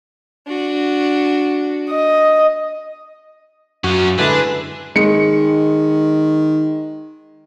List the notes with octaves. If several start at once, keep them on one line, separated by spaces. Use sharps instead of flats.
D4 F#4
D#5
F#2 C#4 F4 F#4
D3 G#3 D4 E4 G#4 B4
D#3 G#3 C#7